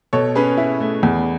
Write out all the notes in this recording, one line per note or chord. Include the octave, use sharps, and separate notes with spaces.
B2 A4 C#5
C#4 G#4 B4
E4
A3
E2